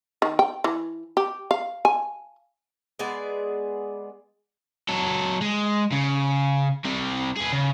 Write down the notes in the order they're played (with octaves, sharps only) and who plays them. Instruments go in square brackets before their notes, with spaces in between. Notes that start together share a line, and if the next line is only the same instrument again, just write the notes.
[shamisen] D#3
G5
E3
G4
F5
G#5
[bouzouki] G#3 B3 G#4 D5
[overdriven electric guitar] F#3 A4
G#3
C#3
C3 G3
G#4 B4
C#3